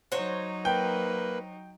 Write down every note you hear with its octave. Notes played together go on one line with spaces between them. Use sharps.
F#3 D#4 F#4 C5 C#5
A#3 B4 G5